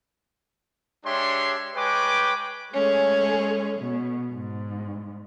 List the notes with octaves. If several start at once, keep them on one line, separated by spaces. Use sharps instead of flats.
G#3 D4 G4 C#5 E5 C6
G#3 B4 C#5 G5 G#5 D6
G#3 A3 C#4 G#4
B2
G#2